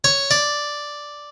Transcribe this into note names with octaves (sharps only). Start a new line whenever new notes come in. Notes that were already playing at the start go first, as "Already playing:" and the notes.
C#5
D5